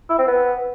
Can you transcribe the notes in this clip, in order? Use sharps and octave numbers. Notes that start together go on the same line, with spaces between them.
E4
C4
B3